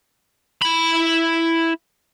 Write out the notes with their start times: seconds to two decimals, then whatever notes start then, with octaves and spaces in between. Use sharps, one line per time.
0.62 E4 B5